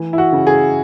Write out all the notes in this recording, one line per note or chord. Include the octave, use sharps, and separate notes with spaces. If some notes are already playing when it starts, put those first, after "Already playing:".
Already playing: E3 A3
E4
F#4
C#3
G#4